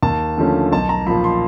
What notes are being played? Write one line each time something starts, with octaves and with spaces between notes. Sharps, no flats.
D#2 A5
D3 F3 A3 C#4
B1 A5
A#5
A#2 F3 B5
C6